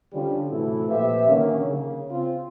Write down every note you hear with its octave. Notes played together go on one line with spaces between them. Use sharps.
D3 F3 G3 C#4
A2 C3 E3 E4 F#4 A4
A#2 F3 F4 G4 B4 E5
D3 D#3 F#3 A#3 C#4
C#3
C4 F4